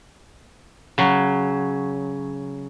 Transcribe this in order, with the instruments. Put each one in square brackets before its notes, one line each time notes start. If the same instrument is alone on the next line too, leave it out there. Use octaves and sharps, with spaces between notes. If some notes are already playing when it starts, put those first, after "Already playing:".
[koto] C#3 F#3